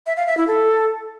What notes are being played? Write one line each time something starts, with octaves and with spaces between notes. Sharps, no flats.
E5
F5
E5
E4
A4